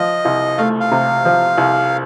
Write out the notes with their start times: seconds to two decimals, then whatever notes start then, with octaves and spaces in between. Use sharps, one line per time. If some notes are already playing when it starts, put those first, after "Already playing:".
Already playing: F3 D#5
0.25 C2
0.58 A3 F5
0.80 F5
0.91 C3
1.25 F3
1.58 C2